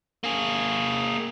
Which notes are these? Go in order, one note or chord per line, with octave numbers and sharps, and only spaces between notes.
A#3 G#4